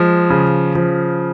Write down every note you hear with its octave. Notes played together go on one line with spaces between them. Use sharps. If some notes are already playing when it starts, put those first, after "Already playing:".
Already playing: F3 G#3
C#3
F3